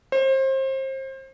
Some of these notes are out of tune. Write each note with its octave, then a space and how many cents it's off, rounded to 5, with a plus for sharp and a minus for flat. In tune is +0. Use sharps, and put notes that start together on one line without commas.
C5 +30